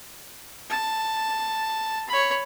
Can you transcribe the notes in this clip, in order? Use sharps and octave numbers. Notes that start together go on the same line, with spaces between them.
A5
C#5 B5